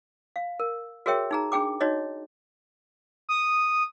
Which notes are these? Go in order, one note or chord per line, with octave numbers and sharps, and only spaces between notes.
F5
A#4
F#4 G#4 A#4 C#5 E5 G5
D#4 G#4 A#5
D4 G#4 G5 D6
D#4 F#4 C#5 D#5
D#6